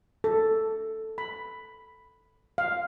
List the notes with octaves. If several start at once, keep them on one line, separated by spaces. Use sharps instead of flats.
A4
B5
F5